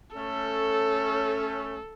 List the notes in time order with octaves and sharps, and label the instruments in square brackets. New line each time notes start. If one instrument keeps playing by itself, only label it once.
[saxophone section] A3 C#4 [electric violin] A4